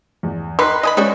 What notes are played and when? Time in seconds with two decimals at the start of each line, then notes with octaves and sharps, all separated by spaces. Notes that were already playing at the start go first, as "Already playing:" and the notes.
0.23 E2
0.59 D#3 B4 B5 C6
0.83 D#5 G#5 B5
0.97 G3 G#3 B3 C#4 F#4